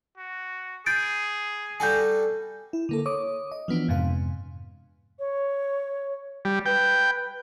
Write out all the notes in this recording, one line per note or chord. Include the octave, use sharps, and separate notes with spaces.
F#4
G#4 B5 G6 A6 D7
G3 F#4 A4 G#5 G6
E4
D3 A#3 A4
C#5 D6 D#6
D#5
E3 F3 B3 D4
F2 G#2 C3 F5
C#5
G3
B4 G5